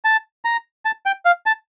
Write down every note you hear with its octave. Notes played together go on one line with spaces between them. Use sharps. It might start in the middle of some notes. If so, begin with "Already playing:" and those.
A5
A#5
A5
G5
F5
A5